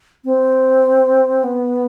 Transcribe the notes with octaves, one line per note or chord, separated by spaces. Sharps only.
C4
B3